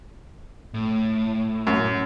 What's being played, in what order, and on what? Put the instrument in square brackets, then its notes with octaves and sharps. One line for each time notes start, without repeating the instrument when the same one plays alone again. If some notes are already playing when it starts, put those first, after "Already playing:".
[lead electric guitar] A2
[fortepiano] F#2